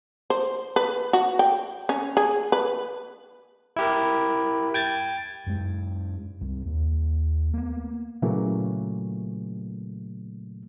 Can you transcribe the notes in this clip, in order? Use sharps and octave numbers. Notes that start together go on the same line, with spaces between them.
C5
B4
F#4
G5
C#4
G#4
B4
E4 G4 A#4
G5 G#6 A6
F#2 G#3
C2
D#2
A#3 B3
A#2 C#3 E3 F#3 A3 A#3